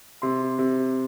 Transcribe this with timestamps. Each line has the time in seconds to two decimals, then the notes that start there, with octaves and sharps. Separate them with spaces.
0.22 C3 C6
0.58 C3